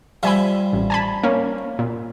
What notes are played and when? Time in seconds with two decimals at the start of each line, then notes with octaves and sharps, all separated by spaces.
0.23 F3 G3 E5 G#5 B5
0.73 A1
0.90 G#5 A5 B5
1.23 A#3 C#4
1.79 A#2